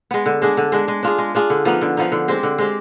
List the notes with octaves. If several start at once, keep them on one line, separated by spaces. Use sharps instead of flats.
G#3 B3
D3
G#3 D4 G#4
D3
G#3 D4 G#4
G#3
D4 F4 G#4
G#3
D4 F4 G#4
D3
F3 B3 D#4
D3
F3 B3 D#4
D3
G#3 C4 G4
D3
G#3 C4 G4